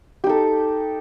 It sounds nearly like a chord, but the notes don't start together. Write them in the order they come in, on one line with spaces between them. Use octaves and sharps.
G4 D#4 A4